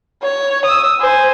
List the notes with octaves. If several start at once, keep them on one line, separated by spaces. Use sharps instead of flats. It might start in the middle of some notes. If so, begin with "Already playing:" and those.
C#5
D#6 E6
C5 G#5